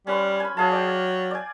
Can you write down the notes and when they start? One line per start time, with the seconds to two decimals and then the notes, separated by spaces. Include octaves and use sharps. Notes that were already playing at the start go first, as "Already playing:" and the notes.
0.07 G3 C#4 B4 C6
0.40 G#5 B5
0.57 F#3 G#4 F5 A5
0.72 D5 G5
1.31 D5 G#5